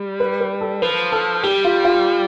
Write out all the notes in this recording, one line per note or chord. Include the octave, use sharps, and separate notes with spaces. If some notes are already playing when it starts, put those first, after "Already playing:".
Already playing: G3
B4
B4
A4
F3 B4
A4
G3 G4
F4
F4